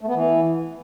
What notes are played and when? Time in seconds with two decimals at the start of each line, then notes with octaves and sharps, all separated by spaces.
0.01 A3
0.08 B3
0.15 E3